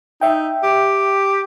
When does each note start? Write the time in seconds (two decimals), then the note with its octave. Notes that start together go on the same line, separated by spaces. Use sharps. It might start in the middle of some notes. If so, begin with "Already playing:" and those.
0.21 D#4 E5 G5
0.63 G4